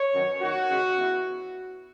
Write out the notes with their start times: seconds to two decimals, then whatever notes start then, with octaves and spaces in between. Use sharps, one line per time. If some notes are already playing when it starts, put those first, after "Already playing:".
Already playing: C#5
0.13 F#2 D#3 F#3 B3 D#4
0.41 D#3 A#3 D#4 F#4
0.69 C#3 G#3 C#4
0.97 E3 B3 E4